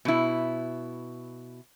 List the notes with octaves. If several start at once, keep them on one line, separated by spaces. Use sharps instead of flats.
B2 E4